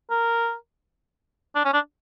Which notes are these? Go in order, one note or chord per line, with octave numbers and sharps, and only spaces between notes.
A#4
D4
C#4
D4